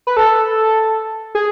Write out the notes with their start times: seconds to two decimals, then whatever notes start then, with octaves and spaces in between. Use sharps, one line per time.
0.07 B4
0.17 A4
1.35 G#4